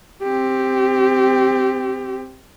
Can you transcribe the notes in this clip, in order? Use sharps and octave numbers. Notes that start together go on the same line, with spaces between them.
C4 G4